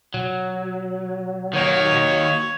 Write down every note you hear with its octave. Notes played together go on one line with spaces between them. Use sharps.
B2 F#3
D#3 A#3 C#5